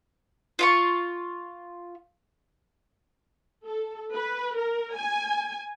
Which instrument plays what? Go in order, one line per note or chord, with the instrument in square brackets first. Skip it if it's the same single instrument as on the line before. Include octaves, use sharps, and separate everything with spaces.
[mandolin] F4 F5 C#6
[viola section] A4
B4
A#4
G#5